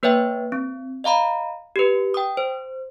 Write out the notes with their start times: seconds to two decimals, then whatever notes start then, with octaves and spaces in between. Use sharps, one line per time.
0.03 A#3 B4 C#5 E5 G5
0.52 C4
1.04 D#5 F5 A#5 B5
1.76 G4 B4
2.14 G5 D#6
2.37 C5